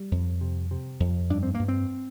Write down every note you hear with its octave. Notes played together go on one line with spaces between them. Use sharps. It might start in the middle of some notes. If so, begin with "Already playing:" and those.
Already playing: G3
F2
C3
C3
F2
G2 D4
C4
G2 A#3
C4